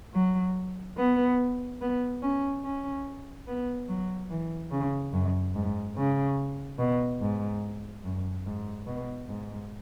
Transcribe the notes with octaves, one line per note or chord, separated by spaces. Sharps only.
F#3
B3
B3
C#4
C#4
B3
F#3
E3
C#3
F#2
G#2
C#3
B2
G#2
F#2
G#2
B2
G#2